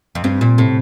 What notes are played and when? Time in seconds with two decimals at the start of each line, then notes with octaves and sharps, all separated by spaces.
0.15 F2
0.24 G2 C4
0.41 A#2
0.58 A2 C3